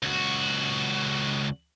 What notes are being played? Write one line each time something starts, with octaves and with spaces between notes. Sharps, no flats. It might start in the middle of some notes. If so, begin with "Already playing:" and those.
C#2 F#4